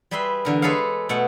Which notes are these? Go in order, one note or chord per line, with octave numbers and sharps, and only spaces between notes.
G3 G#4 B4 E5 C6
E2 D3 A#4
G#3 G#4 A4 B4 C#5 F5
B2 A3 F#5